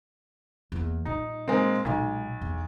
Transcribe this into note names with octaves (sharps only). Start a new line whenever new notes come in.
E2 A#3
A#2 G3 D#4
G#3 A#3 C4
B1 A#2 G#3
E2